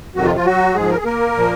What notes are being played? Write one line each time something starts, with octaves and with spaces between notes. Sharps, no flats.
F2 C3 D#3 F#3 F#4
F3 F4
F3 F4
F#3 F#4
G#2 F3 G#3 G#4
A#4
G#4
A#3 A#4
A#2 F3